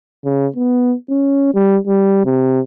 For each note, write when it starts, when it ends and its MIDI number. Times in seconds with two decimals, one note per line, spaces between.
0.25 0.47 49
0.56 0.95 59
1.10 1.54 61
1.54 1.78 55
1.87 2.22 55
2.25 2.61 48